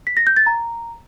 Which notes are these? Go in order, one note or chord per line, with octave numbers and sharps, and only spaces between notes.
B6
A#6
G6
A6
A#5